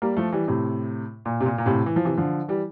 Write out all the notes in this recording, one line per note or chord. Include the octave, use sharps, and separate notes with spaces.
G3 A#3
F3 A3
E3 G3
A2 C3
A#2
C3
A#2
A#2
A2 C3
E3
F3
C3 E3
D3 F3
E3 G3